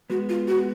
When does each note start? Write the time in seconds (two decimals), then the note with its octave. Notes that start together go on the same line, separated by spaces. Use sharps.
0.10 G#3 B3 F#4
0.29 F4
0.48 F#4